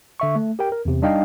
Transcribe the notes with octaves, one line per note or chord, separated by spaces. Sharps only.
D3 E5 C#6
A3
G4 A#4 G5
A#4
E2 C3
G3 D4 D#4 D#5 F5 G5